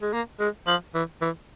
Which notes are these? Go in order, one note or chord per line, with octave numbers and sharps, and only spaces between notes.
G#3
A#3
G#3
F3
E3
E3